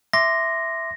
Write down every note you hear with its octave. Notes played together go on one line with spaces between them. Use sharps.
E5 C6 D6 A#6